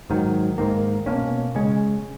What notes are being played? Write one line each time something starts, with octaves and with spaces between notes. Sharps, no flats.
G#2 D#3 F#3
G#2 D#3 A#3
B2 A#3 C#4
C#3 G#3 C#4